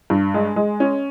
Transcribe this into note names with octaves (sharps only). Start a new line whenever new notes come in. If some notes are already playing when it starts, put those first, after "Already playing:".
G2
G#3
G#3
C#4